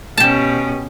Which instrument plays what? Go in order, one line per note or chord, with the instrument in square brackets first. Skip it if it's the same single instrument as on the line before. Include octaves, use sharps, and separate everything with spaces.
[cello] B2 C#4 [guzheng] G4 A5